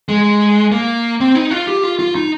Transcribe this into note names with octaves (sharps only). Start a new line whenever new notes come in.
G#3
A#3
C4
D#4
F4
G4
F4
F4
D#4